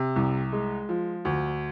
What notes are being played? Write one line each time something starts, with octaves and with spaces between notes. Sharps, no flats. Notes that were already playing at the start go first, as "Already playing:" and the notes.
Already playing: C3
C2
G#3
F3
D2